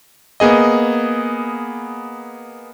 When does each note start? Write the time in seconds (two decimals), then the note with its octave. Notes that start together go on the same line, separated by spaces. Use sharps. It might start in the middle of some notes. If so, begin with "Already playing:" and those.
0.40 A#3 B3 G#4 D#5